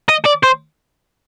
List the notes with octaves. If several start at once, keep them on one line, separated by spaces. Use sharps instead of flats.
D#5
D5
C5